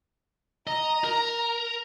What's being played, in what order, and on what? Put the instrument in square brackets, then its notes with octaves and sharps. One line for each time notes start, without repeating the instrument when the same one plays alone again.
[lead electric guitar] D#5 [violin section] A#5
[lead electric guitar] A#4